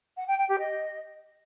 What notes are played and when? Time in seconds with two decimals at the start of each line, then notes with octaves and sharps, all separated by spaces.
0.17 F#5
0.27 G5
0.38 G5
0.48 G4
0.59 D#5